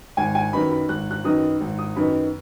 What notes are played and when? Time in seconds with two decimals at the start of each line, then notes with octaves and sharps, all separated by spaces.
0.17 G#1 G#5
0.35 G#5
0.53 F#2 D#3 B3 D#4 B5
0.71 B5
0.89 G#1 F#6
1.11 F#6
1.24 F#2 D#3 B3 D#4 D#6
1.61 G#1
1.79 D#6
1.96 F#2 D#3 B3 D#4 B5